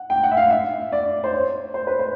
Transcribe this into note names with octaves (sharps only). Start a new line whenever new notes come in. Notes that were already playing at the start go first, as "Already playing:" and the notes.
Already playing: F#5
G5
F#5
E5
F5
E5
D5
C5
C#5
C5
B4
C5